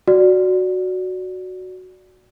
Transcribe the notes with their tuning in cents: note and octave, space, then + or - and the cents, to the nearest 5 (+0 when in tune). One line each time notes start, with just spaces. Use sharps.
F#4 +0 D5 +0